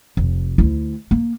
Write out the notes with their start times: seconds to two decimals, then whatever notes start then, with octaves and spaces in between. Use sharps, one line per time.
0.17 F1
0.58 D2 E4
1.11 A#3